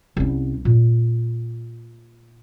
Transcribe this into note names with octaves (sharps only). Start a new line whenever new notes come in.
C2 C#4
A#2